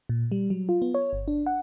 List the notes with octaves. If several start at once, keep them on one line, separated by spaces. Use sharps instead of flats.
A#2
G3
F#3
F4
B3
C#5
G1
D4
F#5